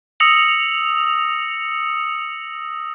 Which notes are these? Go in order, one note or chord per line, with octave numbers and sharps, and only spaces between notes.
D#6 E6 A#6 C#7 F7 F#7